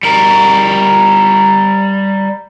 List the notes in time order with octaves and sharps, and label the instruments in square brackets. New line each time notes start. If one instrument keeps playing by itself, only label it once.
[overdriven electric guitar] G3 A#4